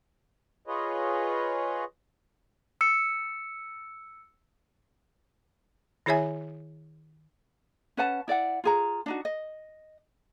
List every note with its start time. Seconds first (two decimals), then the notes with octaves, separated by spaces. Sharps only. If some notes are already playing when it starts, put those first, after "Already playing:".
0.67 F4 G#4 B4 C#5 D#5
2.81 E6 C#7
6.06 D#3 E4 G#4 C#5 E5 G#5
7.97 C#4 B4 F#5 A5
8.28 E4 D5 D#5 F#5
8.64 F4 G#4 A#5
9.06 D4 D#4 F#4
9.25 D#5